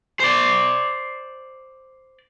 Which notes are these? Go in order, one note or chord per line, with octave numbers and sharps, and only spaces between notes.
C5 D5